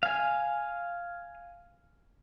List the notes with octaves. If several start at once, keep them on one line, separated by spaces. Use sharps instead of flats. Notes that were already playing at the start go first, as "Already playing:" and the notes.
F5 G#5